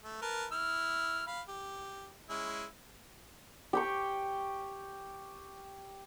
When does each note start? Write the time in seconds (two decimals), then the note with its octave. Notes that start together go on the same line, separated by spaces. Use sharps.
0.03 A3
0.22 A#4 B4 A5
0.52 E4 F6
1.27 F5 B5
1.48 G4
2.30 G#3 C#4 E4
3.73 G4 G5 C#6